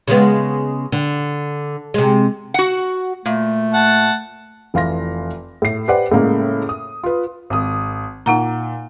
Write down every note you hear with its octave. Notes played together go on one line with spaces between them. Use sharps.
C#3 G#3 B3
D3
C3 G#3
F#4 F#5
A#2 A3
F#5 A5
F1 E3 F5 C6 A#6
A2 C7
G4 B4 C5 D5 F#5
A2 C#3 G#3 A#3
D#6
F4 B4
G#1 D#6
A#2 D#4 F#5 A#5